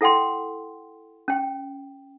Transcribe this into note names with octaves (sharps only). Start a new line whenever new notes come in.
E4 A4 F#5 G5 C6
C#4 G5